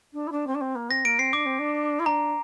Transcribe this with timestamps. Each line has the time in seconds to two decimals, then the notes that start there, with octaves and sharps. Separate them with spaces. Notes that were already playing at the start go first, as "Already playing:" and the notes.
0.13 D4
0.27 E4
0.32 D4
0.47 C4
0.55 D4
0.61 C4
0.75 A#3
0.90 C4 A#6
1.05 A#3 D7
1.19 C4 C7
1.33 D4 D6
1.46 C4
1.59 D4
1.99 E4
2.06 D4 A#5